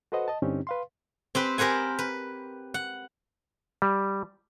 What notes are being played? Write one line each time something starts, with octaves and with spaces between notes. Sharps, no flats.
F#4 A4 B4 C5 D#5 F#5
D#5 A5
G2 D3 C4 C#4 D#4 G4
B4 F5 C6
C4 G4 B4
G4 A#4 C5 F#5 G#5
B4
F#5
G3